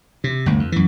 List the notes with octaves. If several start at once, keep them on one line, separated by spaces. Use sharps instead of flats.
C3
G1 D2
F2
F#2 E3